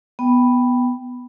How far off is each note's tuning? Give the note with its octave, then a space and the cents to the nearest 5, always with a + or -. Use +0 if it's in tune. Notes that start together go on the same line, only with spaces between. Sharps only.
B3 +0 G5 +0